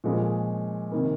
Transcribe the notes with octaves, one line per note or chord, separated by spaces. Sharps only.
A#2 F3 G#3 C#4 G#4
C3 D#3 A#3